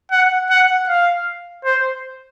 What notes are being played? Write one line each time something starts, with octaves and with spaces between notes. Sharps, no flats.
F#5
F#5
F5
C5